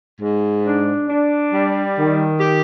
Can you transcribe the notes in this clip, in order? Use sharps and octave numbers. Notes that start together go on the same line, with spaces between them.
G#2
D4
D4
G3
D#3
G4